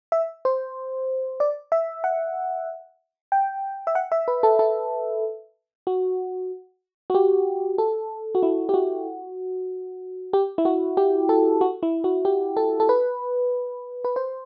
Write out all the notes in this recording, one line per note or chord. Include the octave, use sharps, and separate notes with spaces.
E5
C5
D5
E5
F#5
G5
E5
F#5
E5
B4
A4
A4
F#4
F#4
G4
A4
F#4
E4
G4
F#4
G4
E4
F#4
G4
A4
F#4
E4
F#4
G4
A4
A4
B4
B4
C5